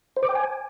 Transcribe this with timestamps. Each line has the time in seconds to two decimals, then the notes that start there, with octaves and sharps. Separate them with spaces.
0.17 C5
0.23 D6
0.29 G5
0.35 G#5